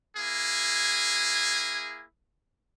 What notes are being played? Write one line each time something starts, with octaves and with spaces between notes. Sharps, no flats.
A#3 E4 G#4